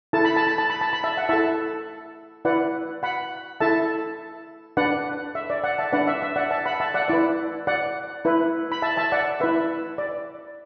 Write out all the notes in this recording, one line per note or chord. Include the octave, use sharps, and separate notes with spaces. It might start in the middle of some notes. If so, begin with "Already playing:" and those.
E4 A4 A5
B5
A5
B5
A5
B5
A5
B5
E5 A5
F#5
E4 A4 E5 A5
E4 B4 D5 F#5
F#5 B5
E4 A4 E5 A5
D4 B4 D5 F#5
E5
D5
D5 F#5
E5 A5
D4 B4 D5 F#5
E5
E5
D5 F#5
E5 A5
F#5 B5
E5 A5
D5 F#5
E4 B4 D5
D5 F#5
E4 B4
B5
E5 A5
E5 A5
D5 F#5
E4 B4 E5
D5